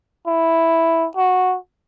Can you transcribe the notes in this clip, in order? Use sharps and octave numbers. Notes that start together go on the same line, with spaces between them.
E4
F#4